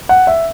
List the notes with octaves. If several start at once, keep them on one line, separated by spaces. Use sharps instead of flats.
F#5
E5